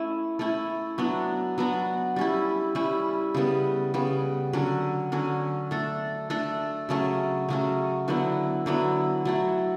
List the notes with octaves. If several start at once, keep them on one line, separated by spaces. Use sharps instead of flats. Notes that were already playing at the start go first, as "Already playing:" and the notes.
Already playing: A3 C#4 E4
A3 C#4 E4
F#3 B3 D4 F#4
F#3 B3 D4 F#4
G3 C#4 E4
G3 C#4 E4
C#3 G3 B3
C#3 G3 B3
D3 F#3 C#4
D3 F#3 C#4
A3 D4 A4
A3 D4 A4
C#3 F#3 A3 C#4
C#3 F#3 A3 C#4
D3 F#3 B3 E4
D3 F#3 B3 E4
F#3 A3 E4